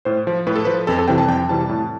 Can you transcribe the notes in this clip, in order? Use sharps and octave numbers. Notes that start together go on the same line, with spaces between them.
A2 C5
F3
A2 B4
A4
F3 B4
F2 A4
A4
C3 E3 G3 G5
A5
F2 G5
C3 E3 G3 A5
A2